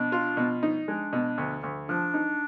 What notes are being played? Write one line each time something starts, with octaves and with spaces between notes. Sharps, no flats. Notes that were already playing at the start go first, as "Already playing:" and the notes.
Already playing: B2 D4
F4
B2
D#4
G#3 D4
B2
D2
D2
F3 D4
D#4